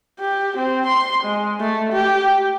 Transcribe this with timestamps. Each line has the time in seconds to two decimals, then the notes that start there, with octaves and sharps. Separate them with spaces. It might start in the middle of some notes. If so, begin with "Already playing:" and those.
0.19 G4
0.58 C4
0.87 C6
1.24 G#3
1.60 A3
1.93 G4